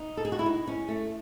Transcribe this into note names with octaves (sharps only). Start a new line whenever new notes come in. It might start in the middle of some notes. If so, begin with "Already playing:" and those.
Already playing: D#4
A4
G#4
F#4
E4
D#4
C#4
A3